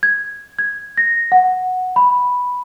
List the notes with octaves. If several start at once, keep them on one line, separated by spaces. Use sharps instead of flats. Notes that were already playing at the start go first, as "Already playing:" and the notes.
G#6
G#6
A#6
F#5
B5